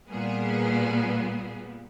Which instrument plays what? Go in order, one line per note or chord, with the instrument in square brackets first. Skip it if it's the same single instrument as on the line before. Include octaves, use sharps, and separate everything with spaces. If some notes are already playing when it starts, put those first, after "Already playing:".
[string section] A#2 G3 B3 G#4